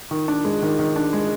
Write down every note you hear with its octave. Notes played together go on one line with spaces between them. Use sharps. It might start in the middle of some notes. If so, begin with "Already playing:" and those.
D#3
D4
G#3
D#3
D#3
D4
G#3